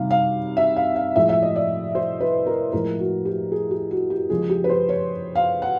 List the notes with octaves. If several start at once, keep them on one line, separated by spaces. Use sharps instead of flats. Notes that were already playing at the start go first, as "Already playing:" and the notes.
Already playing: C3 D#3 G3 F5
F5
E5
F5
F5
A2 F3 G#3 E5
E5
D#5
D5
C5
B4
A#4
A2 F3 G#3 A#4
F#4
G4
G#4
G4
F#4
G4
C#3 F3 G#3 G#4
G4
B4
C5
C#5
F5
F#5